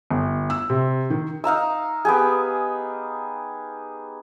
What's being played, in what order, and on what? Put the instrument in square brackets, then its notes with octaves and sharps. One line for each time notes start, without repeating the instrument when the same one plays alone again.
[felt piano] G1
E6
C3
D#3
[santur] D#4 F5 A#5 E6
B3 G4 G#4